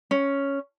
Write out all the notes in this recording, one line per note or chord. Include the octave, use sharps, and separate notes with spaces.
C#4